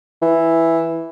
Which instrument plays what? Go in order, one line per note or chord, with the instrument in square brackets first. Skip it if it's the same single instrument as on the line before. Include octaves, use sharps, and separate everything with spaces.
[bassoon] E3